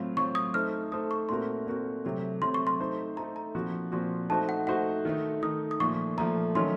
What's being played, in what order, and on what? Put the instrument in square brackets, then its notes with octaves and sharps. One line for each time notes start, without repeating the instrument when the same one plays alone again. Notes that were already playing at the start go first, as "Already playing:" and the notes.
Already playing: [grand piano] A2 F#3 C4 F4
[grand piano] A2 F#3 C4 F4 [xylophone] C#6
[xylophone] D#6
[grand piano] A3 D#4 A4 C5 [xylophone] F6
[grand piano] A3 D#4 A4 C5 [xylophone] D#6
[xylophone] C#6
[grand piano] A#2 A3 C4 F#4 A#4 [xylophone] C6
[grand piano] A#2 A3 C4 F#4 A#4
C3 F#3 A3 C4
[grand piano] C3 F#3 A3 C4 [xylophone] C6
[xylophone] C#6
C6
[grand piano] A3 D#4 A4 C5
[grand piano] A3 D#4 A4 C5 [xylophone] A#5
[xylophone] A#5
[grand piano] A#2 F3 C4 F#4
A#2 F3 C4 F#4
[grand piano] A3 D#4 F#4 C5 [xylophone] A5
[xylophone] F#5
[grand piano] A3 D#4 F#4 C5 [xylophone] F#5
[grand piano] D#3 A3 D#4
[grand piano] D#3 A3 D#4 [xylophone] D#6
[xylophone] D#6
[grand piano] A#2 F3 A3 [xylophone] C#6
[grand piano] A#2 F3 A3 [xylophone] A#5
[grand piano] D#3 F#3 A3 C#4 [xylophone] C6